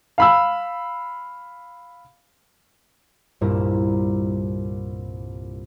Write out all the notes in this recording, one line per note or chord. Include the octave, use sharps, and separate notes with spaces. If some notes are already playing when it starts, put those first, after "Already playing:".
F5 B5 E6
C2 G2 A#2 E4 A#4 A#5